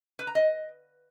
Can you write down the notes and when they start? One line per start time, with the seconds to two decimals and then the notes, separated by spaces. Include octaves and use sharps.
0.19 B4
0.27 A#5
0.35 D#5